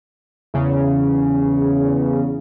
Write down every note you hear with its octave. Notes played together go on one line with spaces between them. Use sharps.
E2 C#3